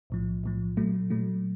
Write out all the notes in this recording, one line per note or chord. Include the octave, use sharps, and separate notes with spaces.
B1 A2 F3
B1 A2 F3
A#2 F#3 A3
A#2 F#3 A3